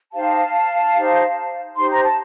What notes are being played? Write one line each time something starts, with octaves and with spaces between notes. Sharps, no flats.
D#4 G4 C5 F5 A5
D#4 G4 C5
D#4 G4 C5 C6
A#5
A5